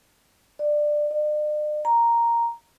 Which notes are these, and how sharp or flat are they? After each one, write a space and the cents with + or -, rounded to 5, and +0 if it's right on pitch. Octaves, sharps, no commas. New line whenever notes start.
D5 +15
D5 +45
A#5 +0